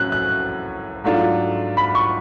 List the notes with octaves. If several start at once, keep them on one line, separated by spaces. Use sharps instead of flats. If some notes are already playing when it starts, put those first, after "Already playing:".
Already playing: A2 F#3 C#4 F#6
F#6
G#2 F#3 A3 D4 F4
B5
C#6